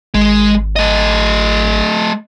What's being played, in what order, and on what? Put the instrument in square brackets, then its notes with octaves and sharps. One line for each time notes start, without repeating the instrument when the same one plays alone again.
[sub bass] G#1 [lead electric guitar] G#3
[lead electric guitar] A3 D#5